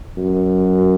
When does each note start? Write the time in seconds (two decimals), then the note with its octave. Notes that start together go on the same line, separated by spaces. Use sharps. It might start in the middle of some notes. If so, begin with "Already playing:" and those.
0.18 F#2